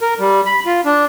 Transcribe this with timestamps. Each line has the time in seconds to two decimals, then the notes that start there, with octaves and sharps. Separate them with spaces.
0.01 A#4
0.19 G3
0.46 B5
0.66 F4
0.85 D4